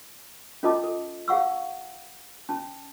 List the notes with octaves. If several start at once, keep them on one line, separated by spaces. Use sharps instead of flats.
C#4 F4 A4 D#5 A5 D6
A4
G#4 F5 F#5 C#6 E6
C#4 A5